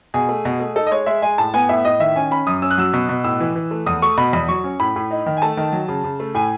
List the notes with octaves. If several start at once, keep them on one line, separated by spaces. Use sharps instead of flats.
B2 G#4
A3
B2
A3
D#4 A4
D#5
G#3 C#5
G#3 E5
G#3 G#5
A2 A5
B3 G#5
A2 E5
A2 D#5
D#3 E5
C#4 G#5
C#4 B5
F#2 D#6
C#4 E6
F#6
F#3 E6
B2
B2
A2 E6
E3
E3
A3
E2 D#6
A3 C#6
B2 B5
E2 B5
F#3 C#6
C#4
A2 B5
A2
D#4
D#3
G#5
A3 A5
D#3
F#3
C#3
C#3
A3
A2 G#5